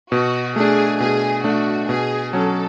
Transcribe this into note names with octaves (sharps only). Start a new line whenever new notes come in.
B2 F#4
A3 D4 G#4
B2 G#4
A3 D4 F#4
B2 G#4
F#3 C#4 A4